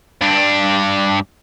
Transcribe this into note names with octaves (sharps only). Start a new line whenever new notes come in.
G2 D4